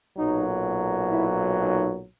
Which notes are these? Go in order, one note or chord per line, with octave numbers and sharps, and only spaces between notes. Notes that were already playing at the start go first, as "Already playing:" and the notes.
B1 A#2 F#3 D#4
E4
D#4